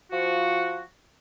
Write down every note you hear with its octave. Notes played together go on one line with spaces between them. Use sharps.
F3 F#4